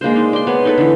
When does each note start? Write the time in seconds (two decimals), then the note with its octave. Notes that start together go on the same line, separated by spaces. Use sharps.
0.01 G#3 A#3 D4 C5
0.16 D#4
0.33 D5 C6
0.47 B3 C#5
0.65 D#4 A4 B4
0.78 D3 E3